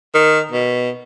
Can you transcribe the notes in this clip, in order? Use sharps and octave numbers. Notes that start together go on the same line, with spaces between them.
D#3
B2